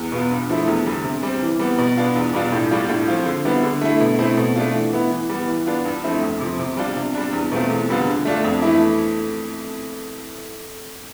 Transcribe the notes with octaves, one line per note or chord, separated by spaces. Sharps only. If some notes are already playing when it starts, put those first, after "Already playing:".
Already playing: E2
B2 B3 F4
G2
F3 A3 E4
E2
D3 G3
C3
G3 C4
E3
G3 B3
B2
B3 D4 F4
E2
B2 G3 D4 F4
A2
G3 D4 F4
A2
F3 C4 F4
D3
G3 B3 E4
D3
A3 E4
B2
A3 C4 E4
B2
A3 D4 F4
E3
B3 E4
E3
G3 B3
E3
B3 D4 F4
G2
F3 A3 C4 E4
F2
C3 F3
C3
G3 D4 F4
C3
G3 D4
E2
B2 A3 C4 F4
E2
D3 G3 B3 F4
D3
A3 D4 F4
F2
E3 A3 E4